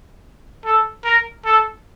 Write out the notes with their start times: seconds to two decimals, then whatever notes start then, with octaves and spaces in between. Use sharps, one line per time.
0.65 A4
1.04 A#4
1.45 A4